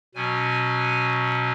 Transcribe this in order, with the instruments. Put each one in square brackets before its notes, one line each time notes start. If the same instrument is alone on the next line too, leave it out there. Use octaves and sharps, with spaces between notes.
[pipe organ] B2 F#3 C#4 G#5